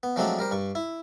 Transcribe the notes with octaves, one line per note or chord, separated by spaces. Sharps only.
B3
F3 F#3 G#3 A3 C4 D4
G3 A#4 C5
G2 C#6
E4